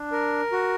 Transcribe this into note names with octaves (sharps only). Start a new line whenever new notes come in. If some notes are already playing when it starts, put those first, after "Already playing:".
Already playing: D4
A#4
F#4